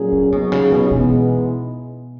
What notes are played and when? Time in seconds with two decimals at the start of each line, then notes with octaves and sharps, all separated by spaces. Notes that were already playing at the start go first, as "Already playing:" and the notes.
Already playing: A#2 F#3 C#4 G#4
0.12 C#3
0.32 G#2 B2 F#3 C#4 G#4
0.52 C#3
0.72 B2
0.91 B2 E3 G#3 B3 D#4